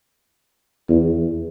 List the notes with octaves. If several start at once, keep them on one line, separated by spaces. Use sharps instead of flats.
E2